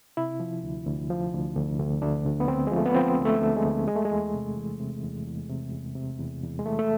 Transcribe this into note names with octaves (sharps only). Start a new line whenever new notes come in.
C3 E4
F3
D2
D2
F3
D2
D2
D2
D2 D4
D2
B3
D2 C4
G#3
F3
A3
B3
F3 C4
D2
A3
D2
G#3
D2
E2 G#3
A3
G#3
E2
C3
E3
C3
E2
E2
C3
E2
C3
E2
E2
G#3
E3 A3
A3